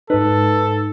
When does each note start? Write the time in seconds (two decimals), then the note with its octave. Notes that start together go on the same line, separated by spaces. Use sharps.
0.10 G#2 D#4 A4 B4